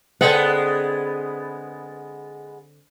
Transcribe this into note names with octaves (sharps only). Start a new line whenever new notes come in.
D3 G#3 B3 C4 F#5